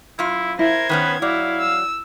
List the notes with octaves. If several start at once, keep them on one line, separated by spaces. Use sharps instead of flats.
F#2 E4 F4
E4 A#4 C5 G#6
D#3 B3 C#4 B4
F#3 E4 D5 F5
E6